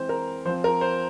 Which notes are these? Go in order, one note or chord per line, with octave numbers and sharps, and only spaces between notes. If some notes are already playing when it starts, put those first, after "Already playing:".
Already playing: E3 G#3 C4 C5
A#4
F3 C4 C5
A#4
C5